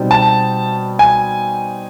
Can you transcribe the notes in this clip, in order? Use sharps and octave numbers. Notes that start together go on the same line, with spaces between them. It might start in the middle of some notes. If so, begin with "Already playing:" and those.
Already playing: B2 G3 C4 D#4
A5
G#5